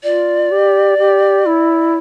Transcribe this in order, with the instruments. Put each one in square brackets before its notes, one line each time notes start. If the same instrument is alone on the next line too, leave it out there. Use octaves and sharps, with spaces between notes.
[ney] F4 [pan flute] D5
[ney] G4
G4
E4